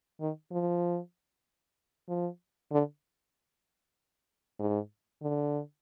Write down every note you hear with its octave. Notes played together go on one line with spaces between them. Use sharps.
D#3
F3
F3
D3
G#2
D3